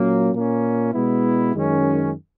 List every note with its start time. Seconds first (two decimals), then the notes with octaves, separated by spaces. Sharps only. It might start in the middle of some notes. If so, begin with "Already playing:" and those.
Already playing: A#2 F#3 A#3 C#4
0.32 A#2 A#3 C#4
0.93 B2 G#3 B3 E4
1.53 F#2 D#3 G#3 C#4